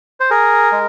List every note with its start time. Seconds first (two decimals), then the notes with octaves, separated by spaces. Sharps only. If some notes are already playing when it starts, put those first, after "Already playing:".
0.20 C5
0.30 G#4 A#4
0.72 G#3